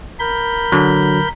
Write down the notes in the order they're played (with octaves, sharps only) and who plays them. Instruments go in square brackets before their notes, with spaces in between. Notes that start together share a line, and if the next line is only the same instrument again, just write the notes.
[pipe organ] A#4 B5 G6
[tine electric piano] D3 F#3